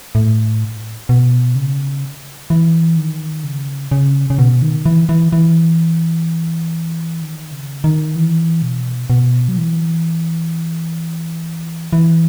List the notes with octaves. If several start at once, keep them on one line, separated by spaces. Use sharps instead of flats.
A2
B2
C#3
E3
D#3
C#3
C#3
C#3
B2
D#3
E3
E3
E3
D#3
C#3
D#3
E3
B2
B2
F#3
E3
E3